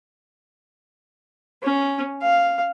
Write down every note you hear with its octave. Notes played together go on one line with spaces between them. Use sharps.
C#4
F5